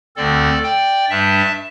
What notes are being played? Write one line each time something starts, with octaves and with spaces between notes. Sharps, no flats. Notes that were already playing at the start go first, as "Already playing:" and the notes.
D2 D3 C4 A4 D5
D5 G5
G2 G3 D4 E5 A5